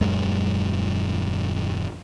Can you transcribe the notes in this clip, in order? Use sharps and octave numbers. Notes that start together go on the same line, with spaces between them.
D#1 F#2 G#3